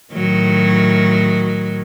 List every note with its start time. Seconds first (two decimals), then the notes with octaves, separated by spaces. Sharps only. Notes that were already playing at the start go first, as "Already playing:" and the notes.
0.13 A2 D#3 F#3